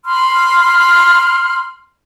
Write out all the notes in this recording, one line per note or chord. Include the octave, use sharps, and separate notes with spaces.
B5 C6 F6